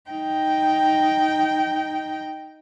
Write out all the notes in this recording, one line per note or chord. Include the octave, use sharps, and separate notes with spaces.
D#4 G5